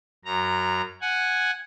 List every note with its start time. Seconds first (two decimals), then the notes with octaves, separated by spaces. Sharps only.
0.25 F#2 A#5
1.01 F#5 G#5